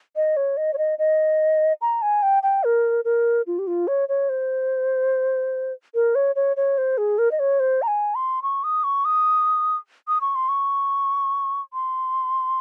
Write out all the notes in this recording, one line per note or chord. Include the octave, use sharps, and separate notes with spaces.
D#5
C#5
D#5
C#5
D#5
D#5
A#5
G#5
G5
G5
A#4
A#4
F4
G4
F4
C#5
C#5
C5
A#4
C#5
C#5
C#5
C5
G#4
A#4
D#5
C#5
C5
A#5
G#5
C6
C#6
D#6
C#6
D#6
D#6
C#6
C6
C#6
C6